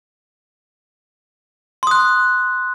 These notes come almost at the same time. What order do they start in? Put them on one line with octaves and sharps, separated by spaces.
C6 D#6 F#6